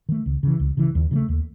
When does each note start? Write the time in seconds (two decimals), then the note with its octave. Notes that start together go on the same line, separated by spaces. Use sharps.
0.09 D#3 A3
0.26 C#2
0.43 C#3 E3
0.60 C#2
0.77 C#3 E3
0.95 D#2
1.11 C#3 E3
1.15 A3
1.29 D#2